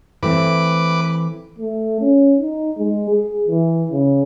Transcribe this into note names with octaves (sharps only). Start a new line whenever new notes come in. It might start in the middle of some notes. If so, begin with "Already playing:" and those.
E3 A3 C4 B4 D6
A3
C#4
D#4
G#3
G#4
E3
C#3